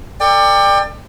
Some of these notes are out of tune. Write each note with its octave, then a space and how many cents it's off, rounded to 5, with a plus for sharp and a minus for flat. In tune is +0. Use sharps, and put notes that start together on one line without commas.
A4 +35 D5 +20 G5 +25